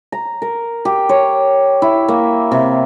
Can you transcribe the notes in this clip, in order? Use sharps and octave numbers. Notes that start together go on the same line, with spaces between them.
A#5
A#4
G4
C#5
E4
A#3
C3